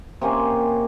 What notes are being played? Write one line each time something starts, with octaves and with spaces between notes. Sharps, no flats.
C3 A#3 C#4 G#5